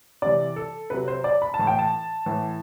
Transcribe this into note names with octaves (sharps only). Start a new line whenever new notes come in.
C3 E3 D5
A4
C3 F#3 B4
C5
D5
B5
A5
A2 E3
G5
A5
A2 E3